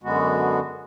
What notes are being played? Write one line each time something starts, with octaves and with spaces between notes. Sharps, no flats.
F#2 D3 G#3 B3 F#4